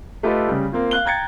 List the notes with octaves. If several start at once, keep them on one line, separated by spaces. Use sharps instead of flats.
A3 F4 G4 A4 B4 D#5
C#3 G3
A#3 C4 F4
F5 F#6 G7
G5 A#5 G#6 A6 C#7